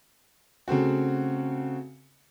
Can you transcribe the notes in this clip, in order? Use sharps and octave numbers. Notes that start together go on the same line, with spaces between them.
C#3 A3 C4 F#4